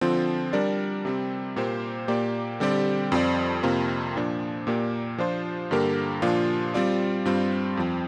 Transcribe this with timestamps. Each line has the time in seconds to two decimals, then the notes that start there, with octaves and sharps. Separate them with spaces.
0.01 D3 F3 C4 F4
0.53 G3 D4 A#4 D5
1.05 C3 G3 C4
1.56 A#2 A#3 G4 C5
2.08 A#2 A#3 G4 D5
2.60 D3 G3 C4 G4 D5
3.12 F2 F3 C4 F4 D5
3.63 F2 C3 A#3 F4 A#4
4.16 A#2 F3 D4
4.67 A#2 A#3 G4 D5
5.18 F3 D4 F4 C5
5.71 G2 D3 A#3 G4 A#4
6.22 A#2 F3 D4 F4
6.74 G3 C4 F4 D5
7.25 G2 G3 C4 F4
7.77 F2 F3 C4